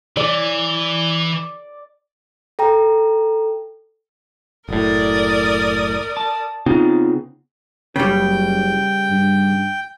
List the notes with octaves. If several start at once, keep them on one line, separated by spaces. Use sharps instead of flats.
E3 D5
A4 G5 A#5
F#1 A2 A#4 D5 D#6
A5
C#3 B3 C4 D#4 F4
F#1 C#3 G3 G5
G2